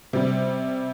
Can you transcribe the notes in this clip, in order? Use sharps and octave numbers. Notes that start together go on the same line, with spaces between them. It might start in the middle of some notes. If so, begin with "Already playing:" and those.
C3 G3